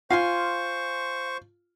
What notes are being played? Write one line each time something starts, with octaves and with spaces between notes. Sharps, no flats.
F4 C5 F5 G#5 C6 C#6